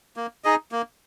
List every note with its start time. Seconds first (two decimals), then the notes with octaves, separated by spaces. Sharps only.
0.17 A#3
0.44 D#4 G#4 D#5
0.72 A#3